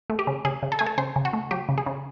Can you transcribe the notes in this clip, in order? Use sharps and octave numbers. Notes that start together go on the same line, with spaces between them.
A3
G4
C#3
C#3 G#4
C#3
A4
A3 G#4
A4
C#3 C5
C#3
F#4
A3
F#3 G4
C#3
G#4
C#3